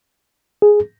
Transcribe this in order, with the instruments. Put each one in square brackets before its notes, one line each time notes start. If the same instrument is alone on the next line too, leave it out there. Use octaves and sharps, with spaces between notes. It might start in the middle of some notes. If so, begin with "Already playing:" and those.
[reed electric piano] G#4